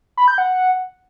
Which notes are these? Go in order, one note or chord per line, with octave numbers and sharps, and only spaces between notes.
B5
G6
F#5